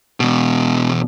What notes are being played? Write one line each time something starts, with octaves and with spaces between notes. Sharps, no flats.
E2 B2